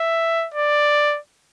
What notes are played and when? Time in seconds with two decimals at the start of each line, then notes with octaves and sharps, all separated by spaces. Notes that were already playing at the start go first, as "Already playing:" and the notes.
Already playing: E5
0.54 D5